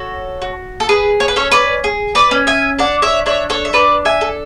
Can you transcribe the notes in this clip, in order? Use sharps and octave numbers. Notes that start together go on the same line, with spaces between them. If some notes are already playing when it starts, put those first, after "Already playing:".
Already playing: F#4 A4 C#5
F#4
A4
G#4 B4
C#5
B4
C#4 A4 C#5
B4 D5
G#4
B4 D5
C#4
E5 G#5
D4 D5 F#5
C#5 E5
D4 C#5 E5
A4 C#5
E5
D4 B4 D5
E5 G#5
A4